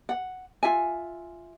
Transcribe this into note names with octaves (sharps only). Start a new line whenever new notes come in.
F#5
F4 E5 G#5